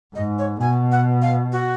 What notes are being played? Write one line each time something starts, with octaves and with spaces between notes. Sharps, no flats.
G#2 D#5
C#5
B2 G#5
F#5
F5
F#4